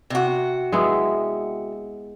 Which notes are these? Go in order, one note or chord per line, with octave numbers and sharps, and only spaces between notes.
C3 F#4
G#3 B3 E4